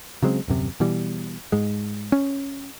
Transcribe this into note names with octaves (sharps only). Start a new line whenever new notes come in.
C#3 F#3 G#3 C4
D#1 F#2 C3
B2 E3 G3
G#2 G#3
C#4